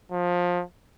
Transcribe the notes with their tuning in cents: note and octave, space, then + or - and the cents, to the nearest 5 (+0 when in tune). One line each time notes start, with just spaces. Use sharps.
F3 +20